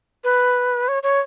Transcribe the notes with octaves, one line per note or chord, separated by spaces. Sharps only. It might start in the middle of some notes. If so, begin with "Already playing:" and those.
B4
C#5
C#5